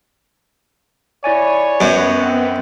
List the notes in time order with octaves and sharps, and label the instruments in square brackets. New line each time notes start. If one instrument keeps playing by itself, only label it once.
[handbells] E4 D5 G#5 [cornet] C#5
[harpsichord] F#2 [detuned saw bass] B3 [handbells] B4 D#5 G6
[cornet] C4